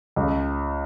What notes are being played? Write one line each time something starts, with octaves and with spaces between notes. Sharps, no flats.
C#2